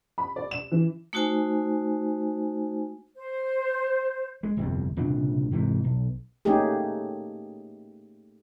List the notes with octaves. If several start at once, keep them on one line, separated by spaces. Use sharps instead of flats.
B5
D5
E7
E3
A3 D#4 F#4 C5 G#5
C5
G#3
G1 C2 F2
C2 A#2 C#3 D4
G#2 C3 E3
B1
A3 A#3 C#4 D#4 G4 G#4